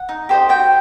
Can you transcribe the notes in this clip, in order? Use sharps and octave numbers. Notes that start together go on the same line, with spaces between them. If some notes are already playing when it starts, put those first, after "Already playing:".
Already playing: F#5
D#4
G4 C5 D#5
F#4 G5